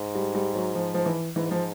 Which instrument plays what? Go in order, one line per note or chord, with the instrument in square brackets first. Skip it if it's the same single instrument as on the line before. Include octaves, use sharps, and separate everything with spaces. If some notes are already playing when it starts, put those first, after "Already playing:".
Already playing: [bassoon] G#2
[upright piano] G3
G3
F#3
F3
F3
E3
[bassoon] G#2 [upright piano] E3
[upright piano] F3